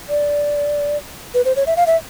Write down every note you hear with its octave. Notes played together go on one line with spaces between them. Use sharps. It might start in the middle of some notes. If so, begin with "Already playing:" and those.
D5
B4
C5
C#5
E5
F5
E5